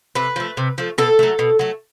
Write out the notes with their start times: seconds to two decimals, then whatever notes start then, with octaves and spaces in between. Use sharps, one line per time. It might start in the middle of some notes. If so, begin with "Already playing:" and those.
0.15 C3 B4
0.36 F3 A3
0.57 C3
0.78 F3 A3
0.98 B2 A4
1.19 F#3 A3
1.39 B2
1.59 F#3 A3